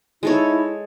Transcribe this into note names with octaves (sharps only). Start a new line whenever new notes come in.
G#3 D#4 E4 A4 C#5